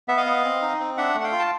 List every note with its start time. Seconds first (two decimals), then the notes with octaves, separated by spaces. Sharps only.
0.08 B3 E5
0.17 D#5 F5
0.26 B3
0.44 C4
0.62 D#4
0.80 C4
0.97 D4 E5 F#5
1.15 A3
1.20 F#5
1.24 F5 G5
1.32 F4
1.39 A5